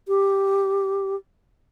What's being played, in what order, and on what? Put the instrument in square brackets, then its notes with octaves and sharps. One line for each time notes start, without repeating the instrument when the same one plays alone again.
[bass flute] G4